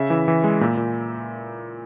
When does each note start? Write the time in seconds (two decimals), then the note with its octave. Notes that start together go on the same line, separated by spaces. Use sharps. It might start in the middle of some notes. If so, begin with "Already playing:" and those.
Already playing: C#3 E5
0.10 E3
0.28 E3
0.44 G#3
0.61 A#2
0.77 A#2